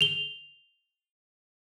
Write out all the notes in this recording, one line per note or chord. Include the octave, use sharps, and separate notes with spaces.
F7 G7